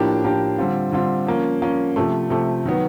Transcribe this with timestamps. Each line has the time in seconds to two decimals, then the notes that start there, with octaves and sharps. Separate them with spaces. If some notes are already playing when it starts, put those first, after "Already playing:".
Already playing: A2 F3 A#3 D4 G4
0.24 A2 F3 A#3 D4 G4
0.59 D3 G3 C4 F4
0.92 D3 G3 C4 F4
1.27 F3 A#3 C#4
1.62 F3 A#3 C#4
1.96 C3 F3 A3
2.30 C3 F3 A3
2.65 D#3 F#3 B3